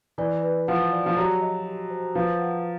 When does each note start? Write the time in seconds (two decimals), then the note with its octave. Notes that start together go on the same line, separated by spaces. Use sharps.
0.18 E3 D5
0.43 B4
0.68 F3 F#5
0.92 D5
1.06 F3
1.17 F#3 G4
1.41 D#5
1.66 G4
1.90 C5
2.15 F3 B4
2.39 F#5